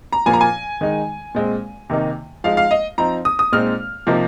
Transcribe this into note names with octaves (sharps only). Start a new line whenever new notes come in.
A#5
A#2 F3 A#3 G#5
A#5
G#5
D#3 G#3 D#4
A#2 G#3 C4
C3 D#3 A#3 D#4
F3 G#3 D#4 F5
F5
D#5
F3 C4 D#4 A#5
D#6
D#6
A#2 G#3 C4 D#4 F6
C3 F3 A#3 D#4